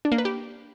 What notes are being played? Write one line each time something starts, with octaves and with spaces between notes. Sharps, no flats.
D4
A#3
B4
G4